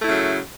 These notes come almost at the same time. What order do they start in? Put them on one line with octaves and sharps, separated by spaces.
A3 E4 C#3 F#3